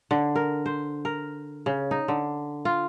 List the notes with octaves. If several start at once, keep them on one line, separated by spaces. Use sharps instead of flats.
D3
A#4
C5
A#4
C#3
D#4
D3
F4